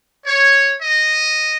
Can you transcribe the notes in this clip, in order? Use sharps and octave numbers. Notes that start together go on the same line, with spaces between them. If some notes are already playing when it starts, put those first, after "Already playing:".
C#5
D#5